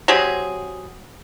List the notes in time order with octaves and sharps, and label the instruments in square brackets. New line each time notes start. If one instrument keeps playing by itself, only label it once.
[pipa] F#3 C4 G4 G#4